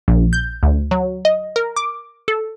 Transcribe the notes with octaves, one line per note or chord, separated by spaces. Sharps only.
A#1
G6
D2
F#3
D#5
A#4
D6
A4